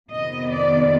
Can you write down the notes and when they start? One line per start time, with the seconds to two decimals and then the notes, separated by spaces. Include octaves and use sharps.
0.10 F2 C3 D#3 B3 D#5
0.52 D5